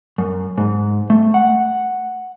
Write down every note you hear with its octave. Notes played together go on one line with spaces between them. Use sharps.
F#2
G#2
A3
F#5